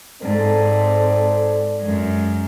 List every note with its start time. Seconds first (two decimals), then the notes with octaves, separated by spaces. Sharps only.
0.23 G#2 C4 A4 D5
1.81 F#2 G#3